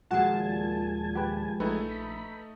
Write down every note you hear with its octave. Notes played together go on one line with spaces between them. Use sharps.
D#2 A#2 F3 G#3 F#4 G#4 G#5 A5
G4 B4
A#1 A3 D#4 A4 B4
B5